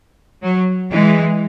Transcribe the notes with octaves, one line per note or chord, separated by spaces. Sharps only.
F#3
E3 G#3